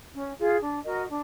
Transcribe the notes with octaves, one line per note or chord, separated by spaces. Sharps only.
C#4
F4 G#4
D4
F#4 A#4 D#5
D4